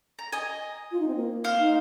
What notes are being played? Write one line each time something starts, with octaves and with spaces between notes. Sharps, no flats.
A#5
D#5 G#5
F4
D#4
C4
A#3
C5 F5
D#4